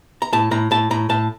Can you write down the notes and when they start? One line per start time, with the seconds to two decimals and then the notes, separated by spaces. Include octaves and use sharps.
0.22 A#5
0.33 A2 A5
0.51 A2 A#5
0.71 A2 A5
0.91 A2 A#5
1.09 A2 A5